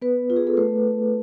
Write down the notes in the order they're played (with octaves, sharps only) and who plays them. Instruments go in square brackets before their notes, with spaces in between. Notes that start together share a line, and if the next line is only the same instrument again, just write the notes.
[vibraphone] B3 B4
F4
G#4
A4
A3 B4